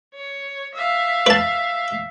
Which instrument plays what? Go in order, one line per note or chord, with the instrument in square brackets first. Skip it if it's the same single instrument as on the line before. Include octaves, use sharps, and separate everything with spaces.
[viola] C#5
E5 F5
[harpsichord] B4 A5